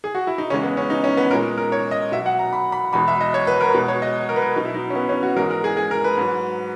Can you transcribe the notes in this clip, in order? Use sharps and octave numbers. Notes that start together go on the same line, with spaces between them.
G#4
F#4
E4
D#4
E2 C#3 E3 G#3 C#4
B3
C#4
D#4
C#4
B3
A#2 G#3 A#4
A#4
C#5
D#5
B2 F#3 E5
F#5
A#5
B5
B5
E2 B2 G#3 B5
E5
D#5
C#5
B4
A#4
B2 G#3 B4
C#5
D#5
A#4
B4
A#4
B2 F#3 D#4
E4
D#4
C#4
B3
C#4
F#4
G#2 E3 G#3 A#4
A#4
G#4
G#4
A#4
B4
G#2 F#3